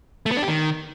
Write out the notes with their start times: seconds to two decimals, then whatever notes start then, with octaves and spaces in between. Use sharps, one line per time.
0.26 A3
0.31 B3
0.37 D4
0.42 G4
0.48 D#3